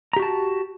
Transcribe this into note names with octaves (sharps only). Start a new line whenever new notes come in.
F#4 G4 A5 A#5